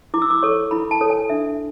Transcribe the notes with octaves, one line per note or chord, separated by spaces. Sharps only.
E4 D6
E6
D6
A4 C#5 C#6
E4 B5
A5
A4 C#5
G#5
D4 E5